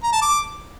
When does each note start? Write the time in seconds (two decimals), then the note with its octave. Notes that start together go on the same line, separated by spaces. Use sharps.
0.03 A#5
0.13 A5
0.22 D6